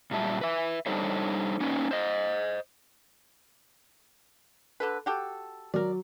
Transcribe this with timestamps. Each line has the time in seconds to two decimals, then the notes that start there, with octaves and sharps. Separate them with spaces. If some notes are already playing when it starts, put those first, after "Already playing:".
0.11 A#2 F#3 G3 E5 A5
0.41 B4 E5
0.86 G3 D4 D#4 A4 C5 C#5
1.60 A#3 C#4 D#4 B4
1.91 C5 D#5
4.80 D3 A4 B4
5.06 F#4 G4 A4
5.74 F#3 A#4 D5